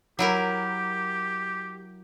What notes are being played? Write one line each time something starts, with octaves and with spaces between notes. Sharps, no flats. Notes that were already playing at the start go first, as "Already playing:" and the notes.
F#3 E4 G4 A#4